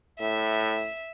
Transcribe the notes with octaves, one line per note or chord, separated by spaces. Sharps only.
A2 E5